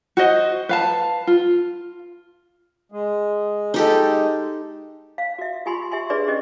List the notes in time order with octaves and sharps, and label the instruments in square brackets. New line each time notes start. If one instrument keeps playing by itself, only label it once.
[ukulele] F#4 C5 D#5
B4 F5 A5
F4
[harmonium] G#3
[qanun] D#4 G4 A4
[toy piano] F5
F#4 E5
F4 G4 G#5 B5 C6
G4 E5 G#5 C6
D4 G#4 B4 D5 E5
C#4 G4 D#5